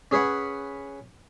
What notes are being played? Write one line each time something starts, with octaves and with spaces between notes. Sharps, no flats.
C#4 G#4 B4 C#5 F#5